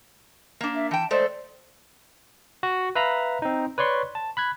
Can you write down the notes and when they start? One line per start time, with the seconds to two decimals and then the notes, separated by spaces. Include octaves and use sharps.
0.61 A#3 D4
0.75 E5
0.91 E3 G5 A5
1.11 G#3 A3 A4 C5 D5
2.63 F#4
2.95 B4 E5 F5 A#5 B5
3.42 C4 D#4
3.78 B4 C#5 D5 C6 C#6
4.15 A5
4.37 B5 F#6 G#6